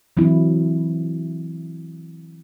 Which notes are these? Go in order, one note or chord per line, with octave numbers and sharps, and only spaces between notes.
E3 F#3 C4 E4